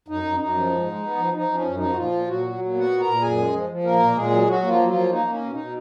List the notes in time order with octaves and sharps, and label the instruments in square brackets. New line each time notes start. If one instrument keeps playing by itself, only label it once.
[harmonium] F#2 D#4
F#2
F#2 D#4
F3
G#2
G#3
B3
F3
F3 D#4
F3
C#4
F#2
F3 D#4
F#4
A#2 F3 F4
A#2
A#2 F#3 F#4
F#3
A#2
B3 F#4 F#5
A#2
A#2 A#4 A#5
F#2 G#4 G#5
G#3
F3
F3
A#2 A#3 A#4
A#2
A#2 G#3 G#4
F#3
F#3 F#4
A#3
F3 F4
F#3
F3 A#3 F4
A#3 D#4
A#3 C#4
B2
D#4
B2